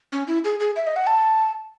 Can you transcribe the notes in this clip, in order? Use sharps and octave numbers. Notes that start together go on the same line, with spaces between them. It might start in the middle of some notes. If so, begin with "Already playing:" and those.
C#4
E4
G#4
G#4
E5
D#5
F#5
A5